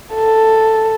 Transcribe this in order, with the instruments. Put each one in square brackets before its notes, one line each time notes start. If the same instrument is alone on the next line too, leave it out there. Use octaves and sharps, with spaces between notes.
[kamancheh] A4